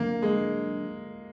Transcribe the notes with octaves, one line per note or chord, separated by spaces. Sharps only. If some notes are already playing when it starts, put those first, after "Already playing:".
Already playing: D3 F#3 A#3 D4
G#3